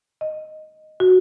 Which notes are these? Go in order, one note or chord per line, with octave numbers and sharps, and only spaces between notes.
D#5
F#4